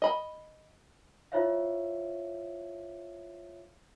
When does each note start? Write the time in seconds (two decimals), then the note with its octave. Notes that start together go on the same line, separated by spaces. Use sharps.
0.02 D#5 B5
1.32 E4 F4 C5 C#5 E5 F5